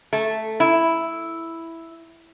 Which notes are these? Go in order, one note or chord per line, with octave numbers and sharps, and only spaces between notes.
A3
E4